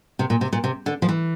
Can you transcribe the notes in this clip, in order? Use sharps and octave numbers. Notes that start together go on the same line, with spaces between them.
C3
A#2
C3
A#2
C3
D3
F3
E3